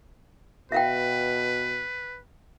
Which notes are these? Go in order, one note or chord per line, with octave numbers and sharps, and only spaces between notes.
B2 B4 E5 F5 G5